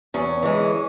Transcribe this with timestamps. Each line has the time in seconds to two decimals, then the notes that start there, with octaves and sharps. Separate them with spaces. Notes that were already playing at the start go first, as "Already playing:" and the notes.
0.14 E2 C#4
0.42 E3 G#3